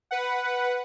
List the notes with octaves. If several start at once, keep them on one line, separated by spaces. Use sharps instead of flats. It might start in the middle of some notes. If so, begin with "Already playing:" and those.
B4 F#5